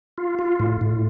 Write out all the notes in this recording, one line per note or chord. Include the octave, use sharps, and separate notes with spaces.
F4
F4
A2
A2